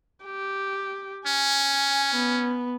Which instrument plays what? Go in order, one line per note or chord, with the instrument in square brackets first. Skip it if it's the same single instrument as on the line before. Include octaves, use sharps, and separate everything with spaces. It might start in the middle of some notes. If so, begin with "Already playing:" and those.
[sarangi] G4
[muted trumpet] C#4 [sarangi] G#5
[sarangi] B3